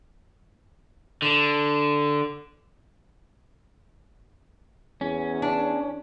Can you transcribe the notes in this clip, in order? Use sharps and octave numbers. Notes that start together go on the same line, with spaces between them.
D3
E2 C#4
D4